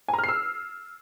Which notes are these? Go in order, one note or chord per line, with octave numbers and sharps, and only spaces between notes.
G#5
A#5
F6
C7
E6